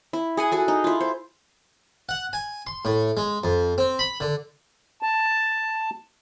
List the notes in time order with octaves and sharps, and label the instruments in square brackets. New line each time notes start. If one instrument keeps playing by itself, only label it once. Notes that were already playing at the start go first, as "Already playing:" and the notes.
[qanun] E4
G#4 F#5 G#5
F#4 G#4 A4
D#4
E4 F4
C5
[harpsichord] F#5
G#5
C6
A2
G#3
F2
C4
B5
D3
[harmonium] A5